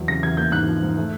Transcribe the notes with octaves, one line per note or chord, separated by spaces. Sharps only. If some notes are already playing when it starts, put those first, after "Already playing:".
Already playing: E2 F#3
C#3 A#6
E2 G#6
A#3 G6
G#2 F#6
F3
G#2
A3